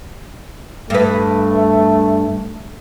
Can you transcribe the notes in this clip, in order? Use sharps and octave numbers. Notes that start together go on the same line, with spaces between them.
G2 A3 B4